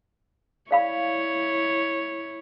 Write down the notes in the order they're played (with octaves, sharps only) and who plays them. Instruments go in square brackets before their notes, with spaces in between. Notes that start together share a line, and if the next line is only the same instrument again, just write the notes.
[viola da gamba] E4 C#5 [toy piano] D5 F5 B5